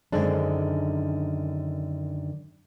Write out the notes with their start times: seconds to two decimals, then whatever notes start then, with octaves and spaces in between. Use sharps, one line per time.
0.12 F#2 D3 D#3 G#3 C4 D4